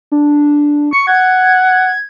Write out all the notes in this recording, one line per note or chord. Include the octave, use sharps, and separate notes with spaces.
D4
C#6 C#7
F#5 G#6